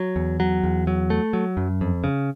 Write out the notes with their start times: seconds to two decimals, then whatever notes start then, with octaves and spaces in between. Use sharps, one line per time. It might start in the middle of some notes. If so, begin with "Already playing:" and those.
Already playing: F#3
0.16 E2
0.40 F#3
0.63 E2
0.87 F#3
1.10 A3
1.33 F#3
1.57 F#2
1.81 F2
2.04 C#3